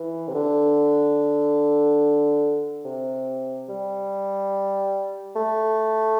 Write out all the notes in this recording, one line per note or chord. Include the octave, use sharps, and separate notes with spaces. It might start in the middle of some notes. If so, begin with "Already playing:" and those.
Already playing: E3
C3
D3
C3
G3
A3